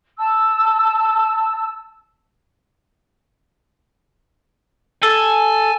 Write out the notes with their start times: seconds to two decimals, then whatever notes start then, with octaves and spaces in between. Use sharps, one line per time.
0.19 A5 E6
5.03 A4 G#5